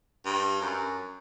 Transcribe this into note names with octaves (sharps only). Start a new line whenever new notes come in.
G2
F#2